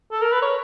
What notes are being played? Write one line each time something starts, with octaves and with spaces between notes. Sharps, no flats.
A4
A#4
B4
C#5